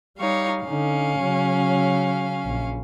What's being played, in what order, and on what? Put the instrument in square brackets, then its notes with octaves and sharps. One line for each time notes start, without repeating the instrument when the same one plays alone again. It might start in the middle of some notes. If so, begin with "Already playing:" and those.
[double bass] G3 [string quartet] D#4 C#5 F5
[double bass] D3 D#4 [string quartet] C#4 F5
[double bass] C#3 F#3
A#1